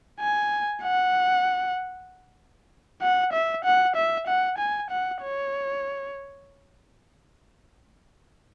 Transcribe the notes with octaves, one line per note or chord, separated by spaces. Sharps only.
G#5
F#5
F#5
E5
F#5
E5
F#5
G#5
F#5
C#5